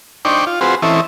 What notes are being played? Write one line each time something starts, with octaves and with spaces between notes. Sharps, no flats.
D4 D#4 C5 D5 G5 C#6
F4
C4 F4 F#4 G#4 B4 C5
E3 C4 C#4 E4 A4 D#5